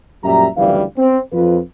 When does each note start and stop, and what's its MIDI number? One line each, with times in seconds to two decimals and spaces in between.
0.24 0.47 42
0.24 0.47 46
0.24 0.47 55
0.24 0.47 67
0.24 0.47 76
0.24 0.47 82
0.56 0.82 30
0.56 0.82 38
0.56 0.82 52
0.56 0.82 53
0.56 0.82 55
0.56 0.82 77
0.97 1.19 60
1.33 1.58 41
1.33 1.58 65
1.33 1.58 71